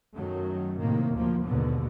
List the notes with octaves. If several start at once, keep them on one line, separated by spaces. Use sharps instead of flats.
F#2 D#3 F#3 A3
A2 C3 D#3 A#3
D2 A2 F3 A#3
D#2 G#2 B2 D3 B3